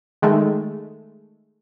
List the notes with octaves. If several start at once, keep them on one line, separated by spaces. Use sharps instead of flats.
D#3 G#3 A3